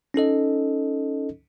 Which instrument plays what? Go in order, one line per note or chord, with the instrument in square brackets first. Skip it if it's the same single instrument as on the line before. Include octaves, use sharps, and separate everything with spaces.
[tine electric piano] C#4 D#4 A4 D#5